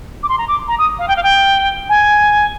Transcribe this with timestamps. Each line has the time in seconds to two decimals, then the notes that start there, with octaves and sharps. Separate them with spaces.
0.23 D6
0.29 C6
0.38 A#5
0.48 D6
0.68 A#5
0.78 D#6
0.99 F5
1.08 G5
1.16 F5
1.23 G5
1.89 G#5